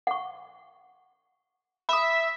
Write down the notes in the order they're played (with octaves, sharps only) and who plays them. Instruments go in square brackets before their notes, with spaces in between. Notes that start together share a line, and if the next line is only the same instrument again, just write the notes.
[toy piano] F#5 C#6
[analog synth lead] E5 [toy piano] B5 D#6